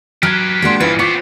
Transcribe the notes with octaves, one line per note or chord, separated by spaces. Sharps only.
F#3 G4 B4 F6 F#6 G#6
G#3 A#3 D4 F#4 C6
A#1 G2 E3 F3 B4
B3 F4 C5 C#6 D6 B6